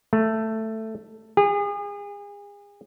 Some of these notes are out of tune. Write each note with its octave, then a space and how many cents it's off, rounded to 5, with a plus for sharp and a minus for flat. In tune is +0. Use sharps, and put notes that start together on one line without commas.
A3 +10
G#4 -35